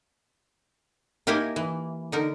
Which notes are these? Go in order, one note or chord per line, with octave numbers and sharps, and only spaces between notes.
A#3 D#4 E4 G4 D#5 G#5
E3
D3 D#4 A#4